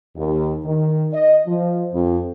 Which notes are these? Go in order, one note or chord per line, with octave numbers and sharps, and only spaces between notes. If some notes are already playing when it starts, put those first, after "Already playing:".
D#2
D#3
D#5
F3
F2